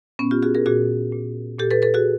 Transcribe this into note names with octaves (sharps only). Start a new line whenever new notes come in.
A#2 B3 C#4
F4 G4
F#4 G#4
G#4 A#4
A#2 F#4 G#4
A#2
A#2 G4 A4
A4 B4
A4 B4
F#4 G#4